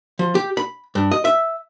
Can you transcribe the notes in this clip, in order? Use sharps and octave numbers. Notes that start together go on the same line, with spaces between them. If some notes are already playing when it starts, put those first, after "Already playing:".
F3
G4
B5
G2
D#5
E5